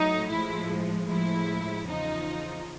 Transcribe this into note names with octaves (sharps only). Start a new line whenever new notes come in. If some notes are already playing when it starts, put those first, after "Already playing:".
Already playing: A2 F#3 A3 D#4
A2 F3 G#3 E4
A2 F3 G#3 E4
E2 C#3 F3 D#4